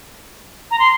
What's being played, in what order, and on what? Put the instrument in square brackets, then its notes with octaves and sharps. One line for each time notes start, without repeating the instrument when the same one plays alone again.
[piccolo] A#5
C6